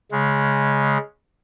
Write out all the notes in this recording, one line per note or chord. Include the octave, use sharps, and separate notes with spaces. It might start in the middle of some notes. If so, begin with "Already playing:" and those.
C#3 G#3